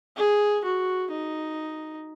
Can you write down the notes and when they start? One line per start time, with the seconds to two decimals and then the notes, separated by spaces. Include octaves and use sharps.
0.17 G#4
0.65 F#4
1.11 D#4